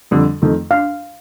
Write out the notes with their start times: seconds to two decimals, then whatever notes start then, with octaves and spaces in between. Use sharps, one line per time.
0.11 F2 D3 G3
0.42 F2 D#3 A3
0.70 D4 F5